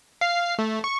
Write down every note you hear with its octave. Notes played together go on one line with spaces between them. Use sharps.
F5 C7
A3
C#6